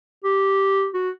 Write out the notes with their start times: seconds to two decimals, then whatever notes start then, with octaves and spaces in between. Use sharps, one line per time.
0.24 G4
0.94 F#4